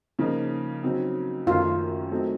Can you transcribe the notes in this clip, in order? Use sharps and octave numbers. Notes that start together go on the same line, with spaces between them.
C#3 F3 A#3 D#4 A#4
C#3 F#3 C4 D#4
F#2 D#3 A3 F4
F#3 A3 C4 D#4